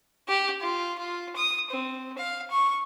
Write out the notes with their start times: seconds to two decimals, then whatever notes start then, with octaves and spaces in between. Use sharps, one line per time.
0.28 G4
0.61 F4
0.98 F4
1.36 D#6
1.70 C4
2.18 F5
2.50 C#6